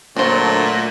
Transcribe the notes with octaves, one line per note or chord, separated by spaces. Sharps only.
A#2 D3 F#3 A3 D4 C5